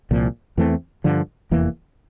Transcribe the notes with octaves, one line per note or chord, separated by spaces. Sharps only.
C2 A#2 F3
E2 E3 A3 C4
G2 D3 F3
F1 E2 E3 A#3